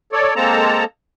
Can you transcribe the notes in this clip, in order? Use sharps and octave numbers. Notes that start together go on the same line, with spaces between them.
A4 C#5 D5
G#3 A#3 C4 A4 A5 A#5